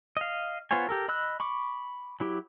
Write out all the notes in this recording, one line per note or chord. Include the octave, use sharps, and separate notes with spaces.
D#5 F5
B3 F4 C5 C#5 G#5
G4 A4 A#4
D#5 B5 E6 F#6
B5 C#6 D6
F#3 E4 G4